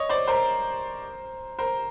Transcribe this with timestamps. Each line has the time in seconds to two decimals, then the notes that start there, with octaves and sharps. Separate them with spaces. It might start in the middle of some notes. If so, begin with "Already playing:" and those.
Already playing: C#5 D#5
0.09 C5 D5
0.28 A#4 C5
1.59 A#4 C5